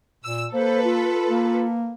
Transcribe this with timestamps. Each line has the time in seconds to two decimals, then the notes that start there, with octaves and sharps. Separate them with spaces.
0.24 A#2 E6
0.53 A#3 A4 B4 C5
0.84 F4
1.30 A#3